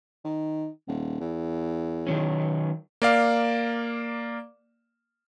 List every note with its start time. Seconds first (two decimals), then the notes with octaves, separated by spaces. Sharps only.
0.24 D#3
0.87 D#1
1.20 E2
2.07 D#3 F#3 C#4
3.02 A#3 D5 F5